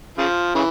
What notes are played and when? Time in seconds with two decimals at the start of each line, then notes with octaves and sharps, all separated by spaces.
0.18 C#3 F3
0.55 C#3 E3